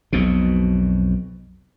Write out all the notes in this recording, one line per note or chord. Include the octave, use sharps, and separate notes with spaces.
B1 F2 B2